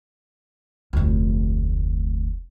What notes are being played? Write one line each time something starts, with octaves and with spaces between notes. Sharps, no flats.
F1 D2